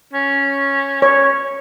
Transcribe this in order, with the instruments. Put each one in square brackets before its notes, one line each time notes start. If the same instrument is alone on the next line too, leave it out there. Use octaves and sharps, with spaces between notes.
[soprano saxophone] C#4
[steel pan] C#5